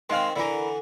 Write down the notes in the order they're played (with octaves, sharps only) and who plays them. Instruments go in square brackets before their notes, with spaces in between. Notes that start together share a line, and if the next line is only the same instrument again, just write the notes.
[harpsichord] D#3 C4 [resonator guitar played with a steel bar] G#3 F5
[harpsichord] D3 E3 [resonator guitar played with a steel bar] E4 A#4